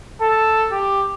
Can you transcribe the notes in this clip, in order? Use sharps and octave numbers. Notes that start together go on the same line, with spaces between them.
A4
G4